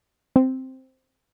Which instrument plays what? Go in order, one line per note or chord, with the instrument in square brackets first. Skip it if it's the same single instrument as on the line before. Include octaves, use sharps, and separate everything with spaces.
[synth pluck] C4